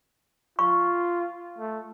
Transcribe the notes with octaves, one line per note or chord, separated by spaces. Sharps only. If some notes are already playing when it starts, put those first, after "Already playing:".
F4 C#6
A3